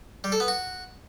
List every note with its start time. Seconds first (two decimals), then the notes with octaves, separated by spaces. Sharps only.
0.24 G3
0.32 A4
0.40 B3
0.48 F#4